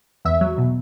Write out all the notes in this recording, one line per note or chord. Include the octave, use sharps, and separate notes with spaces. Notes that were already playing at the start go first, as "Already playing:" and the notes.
E2 E5
F#3
B2